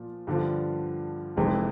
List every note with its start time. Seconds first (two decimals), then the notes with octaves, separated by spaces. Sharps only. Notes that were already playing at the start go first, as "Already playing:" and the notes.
Already playing: A#2 F3 A#3
0.27 G2 D3 F3
1.37 F1 F2 C3 E3 G#3